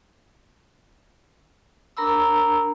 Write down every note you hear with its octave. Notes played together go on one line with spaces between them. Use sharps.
D4 A#4 A#5 B5 E6